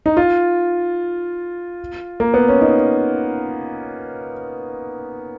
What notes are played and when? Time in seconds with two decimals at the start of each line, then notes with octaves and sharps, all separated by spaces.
0.06 D#4
0.17 F4
2.20 A#3
2.34 B3
2.48 C#4
2.61 D#4